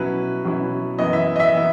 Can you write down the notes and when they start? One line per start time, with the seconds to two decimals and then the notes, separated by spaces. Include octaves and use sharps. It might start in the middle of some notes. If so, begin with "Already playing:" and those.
Already playing: B2 F#3 C#4 E4 B4
0.44 B2 F#3 C#4 E4
0.99 F#2 E3 B3 E4 D#5
1.13 E5
1.36 D#5
1.40 E5
1.55 E3 B3 E4